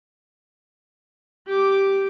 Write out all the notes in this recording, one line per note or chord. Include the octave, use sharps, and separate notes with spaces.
G4 D6